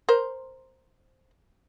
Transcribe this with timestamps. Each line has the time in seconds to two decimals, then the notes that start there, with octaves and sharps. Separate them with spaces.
0.09 A#4 C5